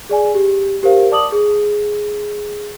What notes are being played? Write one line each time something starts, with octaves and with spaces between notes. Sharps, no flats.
G#4 D5 G#5
G4
G4 A#4 C5 F5
D5 A5 D6 D#6 F#7
G#4